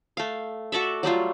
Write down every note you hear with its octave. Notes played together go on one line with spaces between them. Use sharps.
A3 F5
F#4 A4 D5 E5
F#3 G3 A3 F4